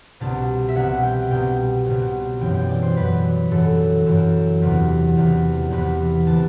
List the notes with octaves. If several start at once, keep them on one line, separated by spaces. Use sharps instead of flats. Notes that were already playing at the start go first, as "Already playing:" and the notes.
C2 B2 A5
E5
C2 B2 F#5
G5
C2 B2 G5
C2 B2
F#2 E3 G5
G5
D5
C5
F#2 E3 B4
F#2 E3 A4
F#2 E3 A4
E2 C3 E3
E2 C3 E3
E2 C3 E3 B4
C3 E3 A5